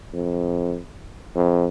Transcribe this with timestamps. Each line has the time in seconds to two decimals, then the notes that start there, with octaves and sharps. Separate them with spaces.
0.14 F2
1.36 F2